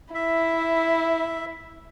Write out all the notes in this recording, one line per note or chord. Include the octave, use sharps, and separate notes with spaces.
E4 E5